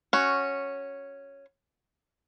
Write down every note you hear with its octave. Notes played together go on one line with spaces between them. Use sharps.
C#4 F#4